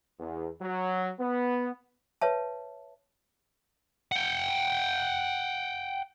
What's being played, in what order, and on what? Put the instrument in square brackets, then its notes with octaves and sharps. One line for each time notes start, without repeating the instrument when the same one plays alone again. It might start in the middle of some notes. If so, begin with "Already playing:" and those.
[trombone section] E2
F#3
B3
[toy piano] B4 C#5 E5 A5
[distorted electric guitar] F#5 G5